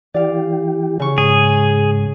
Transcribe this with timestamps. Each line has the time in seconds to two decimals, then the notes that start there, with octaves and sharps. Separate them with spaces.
0.14 E3 G4 D5 F5
1.00 C#3 C#6
1.18 G#2 G#4